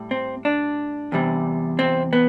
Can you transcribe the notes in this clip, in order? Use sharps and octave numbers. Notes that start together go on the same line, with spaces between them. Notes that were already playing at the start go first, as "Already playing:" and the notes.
Already playing: A2 G3
C4
D4
E2 C3 G3
C4
B3